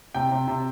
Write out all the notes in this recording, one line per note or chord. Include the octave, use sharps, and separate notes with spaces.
C3 G5
C3
C3